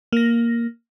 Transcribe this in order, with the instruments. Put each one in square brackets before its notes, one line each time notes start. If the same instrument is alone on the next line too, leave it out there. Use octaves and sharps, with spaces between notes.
[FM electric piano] A#3 A#6